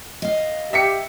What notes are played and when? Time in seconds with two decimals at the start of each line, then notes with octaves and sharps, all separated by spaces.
0.22 D#5 F5
0.73 G4 E5 B6 C#7